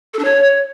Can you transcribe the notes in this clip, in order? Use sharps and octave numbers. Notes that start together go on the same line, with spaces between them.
A4
D4
C#5